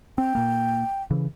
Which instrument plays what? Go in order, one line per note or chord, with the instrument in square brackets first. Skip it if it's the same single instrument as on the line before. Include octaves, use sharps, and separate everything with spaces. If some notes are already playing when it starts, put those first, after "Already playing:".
[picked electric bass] C4 [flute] G5
[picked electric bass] A#2 A#3
C#3 E3